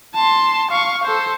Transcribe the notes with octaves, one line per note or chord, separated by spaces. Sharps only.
A5 C6
F5 C#6
A4 C5